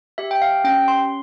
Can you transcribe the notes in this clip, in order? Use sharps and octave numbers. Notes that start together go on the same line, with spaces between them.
G4 E5
G5
F5
C#4 G5
C6